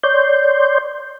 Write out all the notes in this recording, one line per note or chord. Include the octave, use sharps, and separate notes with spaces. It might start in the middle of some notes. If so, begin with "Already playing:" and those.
C#5 D5 C6 G6